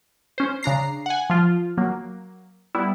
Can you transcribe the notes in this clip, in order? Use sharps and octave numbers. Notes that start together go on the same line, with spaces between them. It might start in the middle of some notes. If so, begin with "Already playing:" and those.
C#4 C5
C#3 D4 A#5 C7
F#5 G#5
F3 F4
F#3 A#3
G3 B3 E4